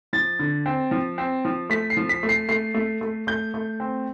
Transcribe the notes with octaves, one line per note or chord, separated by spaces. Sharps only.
F3 A6
D3
C4
F3
C4
F3
A3 B6
C7
F3
B6
A3
C7
A3 C7
A3
A3
A3 G6
A3
C4